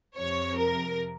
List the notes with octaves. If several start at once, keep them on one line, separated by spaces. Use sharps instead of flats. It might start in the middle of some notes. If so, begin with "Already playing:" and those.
F2 C3 F3 C#5
A#4